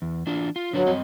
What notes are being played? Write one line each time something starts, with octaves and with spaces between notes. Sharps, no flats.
E2
E3 D4 F4
F4
D3 F#3 D4 B4
G2 C4 D#5